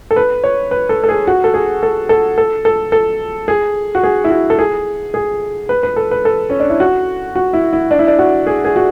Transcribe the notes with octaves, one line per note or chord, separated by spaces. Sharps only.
A4
B4
C#5
B4
A4
A4
G#4
F#4
A4
G#4
A4
A4
A4
A4
A4
G#4
F#4
G#4
E4
F#4
A4
G#4
G#4
B4
B4
A4
B4
A4
C#4
D4
E4
F#4
F#4
E4
E4
D4
E4
D4
F#4
G#4
G#4
F#4